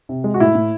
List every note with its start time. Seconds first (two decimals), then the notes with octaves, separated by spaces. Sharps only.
0.09 C3
0.24 G#3
0.34 F#4
0.40 A2 E4
0.55 A2